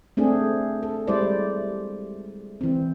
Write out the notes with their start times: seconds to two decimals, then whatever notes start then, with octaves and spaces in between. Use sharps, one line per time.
0.17 A3 C4 D4 G#4
0.83 A4
1.08 G3 G#3 E4 C5 D5
2.61 E3 C4